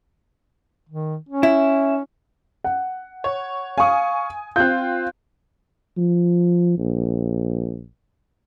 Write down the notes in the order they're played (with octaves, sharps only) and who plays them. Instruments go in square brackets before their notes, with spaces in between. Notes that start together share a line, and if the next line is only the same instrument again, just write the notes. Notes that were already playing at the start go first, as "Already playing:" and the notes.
[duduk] D#3
C#4
[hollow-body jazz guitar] E4
[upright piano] F#5
[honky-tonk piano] C#5
[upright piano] F5 C#6 [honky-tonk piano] G#5 D#6
[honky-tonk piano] C4 F4 [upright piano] F#6 G6
[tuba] F3
A#1